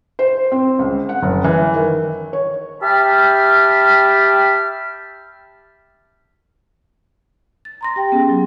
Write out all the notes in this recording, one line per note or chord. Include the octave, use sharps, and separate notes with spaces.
C5
C4
C#2
F#5
F#1
E3
D#3
C#5
G4 E5 G5 A5 B5 F6
A6
A#5 C6 A#6
G4 G5
B3 C#4 G#4
F#3